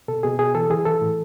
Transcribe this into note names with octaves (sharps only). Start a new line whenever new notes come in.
B2 A4
B2 G#4
B2 G#4
E3 A4
E3 G#4
E3 A4
A2